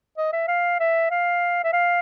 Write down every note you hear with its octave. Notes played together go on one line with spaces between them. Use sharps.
D#5
E5
F5
E5
F5
E5
F5